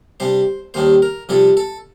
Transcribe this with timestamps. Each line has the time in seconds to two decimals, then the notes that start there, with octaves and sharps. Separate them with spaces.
0.20 C3 G3 D4 C5
0.74 D#2 D#3 G3 D4 C5
1.02 A#4
1.29 F2 C3 G3 D4 A4
1.57 A4